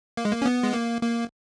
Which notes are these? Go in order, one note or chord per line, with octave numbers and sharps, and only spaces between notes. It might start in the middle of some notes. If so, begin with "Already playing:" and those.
A#3
G#3
A#3
C#4
B3
G#3
A#3
A#3